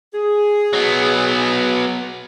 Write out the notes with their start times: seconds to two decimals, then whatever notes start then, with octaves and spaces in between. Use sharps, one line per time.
0.13 G#4
0.73 F#3 B3